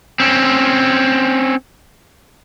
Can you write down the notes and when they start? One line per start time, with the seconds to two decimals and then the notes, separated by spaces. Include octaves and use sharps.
0.20 C4 C#4